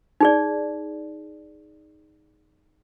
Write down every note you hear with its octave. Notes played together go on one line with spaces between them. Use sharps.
D#4 G#4 D5